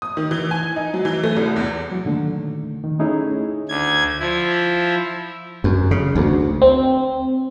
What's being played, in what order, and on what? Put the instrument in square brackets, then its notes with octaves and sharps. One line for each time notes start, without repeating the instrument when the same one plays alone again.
[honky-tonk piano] D#6
D#3
E3
G#5
D#4
F#3
E3
A3
C2
E2
[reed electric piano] F#3
A#2 D3 D#3 A3
D#3
A3 C#4 D#4 E4 G#4 C#5
[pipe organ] D2 G#6
F3 E4
[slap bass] F#2
C#3
D2
[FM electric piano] C4